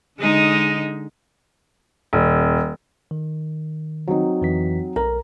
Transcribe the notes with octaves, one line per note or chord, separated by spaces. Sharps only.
D3 G#3 D#4
D#1
D#3
F#3 C4 D#4
F2 E3 B6
B1 A#4 A#5